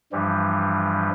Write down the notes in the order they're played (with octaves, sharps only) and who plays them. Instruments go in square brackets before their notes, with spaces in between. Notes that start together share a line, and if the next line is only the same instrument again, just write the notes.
[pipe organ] G2 E3 F3 G3